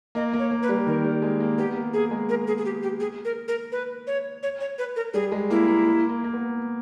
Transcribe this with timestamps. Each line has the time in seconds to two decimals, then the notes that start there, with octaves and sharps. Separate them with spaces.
0.15 A#3 D#5
0.33 A#3
0.39 C#5
0.51 A#3
0.63 B4
0.69 G3
0.87 D#3 A#4
1.04 G3
1.22 G#3
1.40 A#3
1.58 B3 G4
1.76 A#3
1.93 A#3 G#4
2.11 G#3
2.29 A#4
2.47 G#4
2.58 G#4
2.65 G4
2.83 G4
3.00 G#4
3.25 A#4
3.48 A#4
3.72 B4
4.07 C#5
4.43 C#5
4.61 C#5
4.78 B4
4.96 A#4
5.14 G3 G#4
5.32 G#3
5.50 A#3 E4
5.68 A#3
5.85 A#3
6.09 A#3
6.24 A#3
6.33 B3